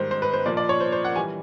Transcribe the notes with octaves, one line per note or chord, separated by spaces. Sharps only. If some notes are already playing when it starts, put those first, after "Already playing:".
Already playing: G#2 D#3 G3 C5
C5
B4
C5
A#2 F3 A#3 D5
D5
C#5
C5
C5
F#5
E3 G3 G#5